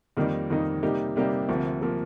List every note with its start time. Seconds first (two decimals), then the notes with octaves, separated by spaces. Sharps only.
0.17 F2 D#3 G3 A#3 D#4
0.50 F2 D#3 G3 A#3 D#4
0.83 C3 G3 A#3 D#4 G4
1.16 C3 G3 A#3 D#4 G4
1.49 D2 C3 F3 A#3
1.82 C3 F3 A#3